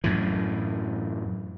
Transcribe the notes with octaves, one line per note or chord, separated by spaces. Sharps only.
F#2 A2 E3